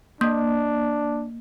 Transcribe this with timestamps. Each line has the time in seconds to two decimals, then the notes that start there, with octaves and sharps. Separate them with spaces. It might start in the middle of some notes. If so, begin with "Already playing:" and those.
0.21 A#3 D4